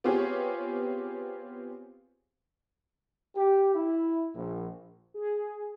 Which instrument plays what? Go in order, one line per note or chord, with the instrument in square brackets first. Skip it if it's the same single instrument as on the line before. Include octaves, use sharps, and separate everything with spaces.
[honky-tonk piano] B3 C4 F4 G4 G#4 C#5
[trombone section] G4
E4
A#1
[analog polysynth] G#4